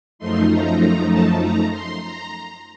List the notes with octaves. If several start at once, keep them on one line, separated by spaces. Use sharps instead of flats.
F#2 F3 A3 D#4 C6
A#5
A#5
A5
A#5
C6
A#5